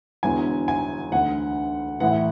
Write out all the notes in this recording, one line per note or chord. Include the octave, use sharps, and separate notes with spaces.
E1 E2 D3 G#5
G#5
D2 D3 F#5
A1 A2 E3 F#5